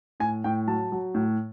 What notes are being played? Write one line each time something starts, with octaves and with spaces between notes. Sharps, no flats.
A2 G#5
A2 G5
F#3 A5
F#3
A2